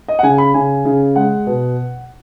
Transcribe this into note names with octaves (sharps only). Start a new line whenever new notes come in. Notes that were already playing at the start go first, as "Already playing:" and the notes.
D#5
F#5
C#3 G#5
B5
C#3 G#5
C#3
G#3 F#5
B2